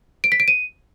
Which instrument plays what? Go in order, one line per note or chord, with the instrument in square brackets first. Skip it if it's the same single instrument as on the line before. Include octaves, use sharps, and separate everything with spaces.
[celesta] D7
B6
D7
D#7